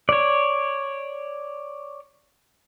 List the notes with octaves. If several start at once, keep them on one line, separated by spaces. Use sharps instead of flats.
C#5 D5